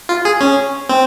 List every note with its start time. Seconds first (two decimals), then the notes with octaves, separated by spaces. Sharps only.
0.09 F4
0.25 G#4
0.41 C#4
0.89 C4